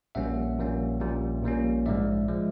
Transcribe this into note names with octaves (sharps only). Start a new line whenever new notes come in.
A#1 A#2 G3 A#3 C#4 E5 F#5
A#1 A#2 G3 A#3 C#4
A#1 A#2 G3 A#3 C#4
A#1 A#2 G3 A#3 C#4
A#1 G#2 F3 G#3 D5 E5
F3 G#3